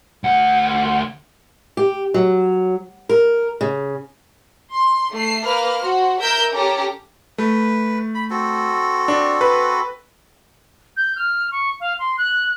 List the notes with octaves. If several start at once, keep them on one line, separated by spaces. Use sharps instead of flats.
D2 F#5
G4
F#3
A#4
C#3
C6
A3 C7
A#3 B4 F6
F#4 C5
A#4 E5 A#5 E6 G6
C#4 G4 A4 A#5
A3 B4
B5
C4 F#4 A4
D4
B4
G6
F6
C#6
F5
C6
F#6